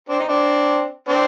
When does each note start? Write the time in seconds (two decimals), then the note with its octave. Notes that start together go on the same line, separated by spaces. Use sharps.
0.09 C4 D4
0.20 D#4
0.29 C4 D4
1.08 C4 D4